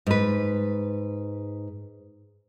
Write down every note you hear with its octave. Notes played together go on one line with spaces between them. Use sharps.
G#2 B4